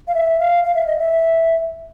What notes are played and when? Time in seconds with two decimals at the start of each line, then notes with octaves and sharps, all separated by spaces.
0.08 F5
0.14 E5
0.40 F5
0.64 F5
0.75 E5
0.86 D#5
0.98 E5